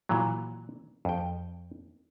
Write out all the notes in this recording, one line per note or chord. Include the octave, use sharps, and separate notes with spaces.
A#2 E3 F#3
F2 G5